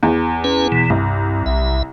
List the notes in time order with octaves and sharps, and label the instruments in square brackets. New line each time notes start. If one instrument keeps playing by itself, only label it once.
[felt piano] E2
[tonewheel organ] C#4 B4
B2 E3
[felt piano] C2 [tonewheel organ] G2
[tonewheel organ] B1 E5